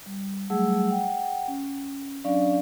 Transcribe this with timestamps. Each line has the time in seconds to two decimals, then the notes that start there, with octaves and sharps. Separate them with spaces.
0.06 G3
0.50 F#3 G3 A3 G#4 F#5 E6
0.90 F#5 G5
1.48 C#4
2.24 F#3 C#4 D4 D5 F5